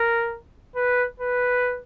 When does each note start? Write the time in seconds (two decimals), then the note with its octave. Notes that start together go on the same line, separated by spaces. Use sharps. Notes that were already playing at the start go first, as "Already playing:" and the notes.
Already playing: A#4
0.76 B4
1.20 B4